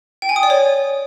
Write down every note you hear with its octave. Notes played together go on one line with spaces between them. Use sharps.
G5
G#5
D#6
D5
C#5